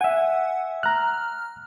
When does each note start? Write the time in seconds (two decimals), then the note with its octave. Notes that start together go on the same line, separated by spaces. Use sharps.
0.01 E5 F#5 G#5
0.83 A#5 F6 F#6